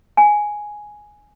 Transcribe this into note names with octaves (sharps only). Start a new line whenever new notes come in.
G#5